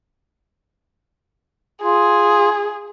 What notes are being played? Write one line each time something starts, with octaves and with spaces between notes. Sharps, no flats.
F4 G#4